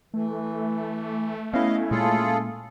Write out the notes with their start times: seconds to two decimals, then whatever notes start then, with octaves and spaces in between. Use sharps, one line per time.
0.14 E3 A3
1.53 B3 C#4 E4 D#5 F5
1.91 A#2 G#3 A#3 F4 G#4 A4